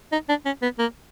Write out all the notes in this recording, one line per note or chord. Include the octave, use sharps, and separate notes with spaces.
D#4
D4
C#4
B3
A#3